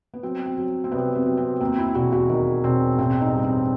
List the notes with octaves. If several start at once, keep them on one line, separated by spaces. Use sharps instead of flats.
B3
F#3 C4
C4
F#3
C4
C2 B3
C4
F#3
C4
D#2 C4
E4
E1 F#4
F#4
D#3
E1 C4
A1 C4
D#4
G2
C4